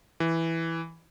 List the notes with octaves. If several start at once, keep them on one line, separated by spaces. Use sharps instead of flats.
E3